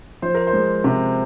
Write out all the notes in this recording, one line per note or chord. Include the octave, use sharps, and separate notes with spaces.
F3 C5
A#4
C5
G#3
C3